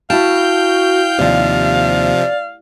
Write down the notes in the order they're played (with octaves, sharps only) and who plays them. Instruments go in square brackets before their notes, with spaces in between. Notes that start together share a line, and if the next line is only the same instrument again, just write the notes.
[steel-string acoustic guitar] E4 A5 [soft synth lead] F#4 [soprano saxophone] F5 [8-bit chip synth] G5 G6
[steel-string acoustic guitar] D#2 [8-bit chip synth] C3 F3 [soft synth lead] D5